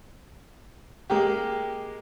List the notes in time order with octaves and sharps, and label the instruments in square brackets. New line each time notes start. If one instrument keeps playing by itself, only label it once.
[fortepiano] G#3 A#3 G4